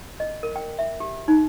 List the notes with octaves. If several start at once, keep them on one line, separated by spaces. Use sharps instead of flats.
D#5
A#4
G5
E5
G4
D#4